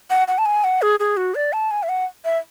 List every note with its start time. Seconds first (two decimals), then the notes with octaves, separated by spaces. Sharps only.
0.10 F#5
0.28 F#5
0.38 A5
0.46 G#5
0.64 F#5
0.82 G#4
1.00 G#4
1.17 F#4
1.35 D5
1.53 A5
1.71 G#5
1.83 E5
1.89 F#5
2.25 E5